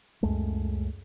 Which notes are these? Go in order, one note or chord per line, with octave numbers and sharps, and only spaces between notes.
C#2 F#2 G#3 A3